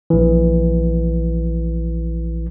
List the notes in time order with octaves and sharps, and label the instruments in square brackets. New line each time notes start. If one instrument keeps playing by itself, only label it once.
[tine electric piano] A#1 E3